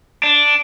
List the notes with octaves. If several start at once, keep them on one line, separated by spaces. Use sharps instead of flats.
D4